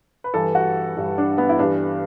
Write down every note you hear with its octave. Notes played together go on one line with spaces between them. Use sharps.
B4
G2 E3 G3 A4
F#4
G2 E3 G3
D4
B3
E4
G2 E3 G3 D4